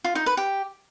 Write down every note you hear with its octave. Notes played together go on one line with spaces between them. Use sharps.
F4
D#4
B4
G4